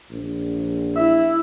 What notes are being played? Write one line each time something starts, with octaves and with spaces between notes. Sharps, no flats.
A#1
E4 E5